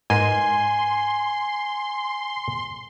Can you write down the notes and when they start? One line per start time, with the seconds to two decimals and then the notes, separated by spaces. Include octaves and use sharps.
0.10 G#2 A#4 B4 G#5 C6